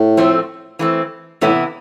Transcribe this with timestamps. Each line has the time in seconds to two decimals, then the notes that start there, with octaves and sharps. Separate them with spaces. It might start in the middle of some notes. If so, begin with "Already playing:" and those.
Already playing: A2
0.17 F3 A3 C4
0.79 E3 A3 C4
1.41 A2 C3 E3 B3 E4